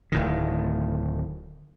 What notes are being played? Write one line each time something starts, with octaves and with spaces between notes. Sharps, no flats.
D1 A2 D#3